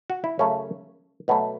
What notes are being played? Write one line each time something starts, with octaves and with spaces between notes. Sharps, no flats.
F#4
E4
F#2 C#3 F#3 A3 C#4
B2 F#3 A3 B3